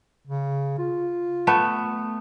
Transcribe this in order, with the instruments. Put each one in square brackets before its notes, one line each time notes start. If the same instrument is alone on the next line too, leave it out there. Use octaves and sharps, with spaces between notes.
[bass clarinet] C#3
F4
[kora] A3 B3